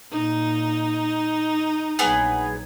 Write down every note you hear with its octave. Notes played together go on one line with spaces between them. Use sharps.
A#2 D#4
A#1 F#3 B3 G#4